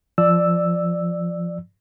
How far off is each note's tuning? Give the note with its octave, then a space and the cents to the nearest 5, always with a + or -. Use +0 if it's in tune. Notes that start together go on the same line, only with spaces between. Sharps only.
F3 -10 D5 +15 E6 +0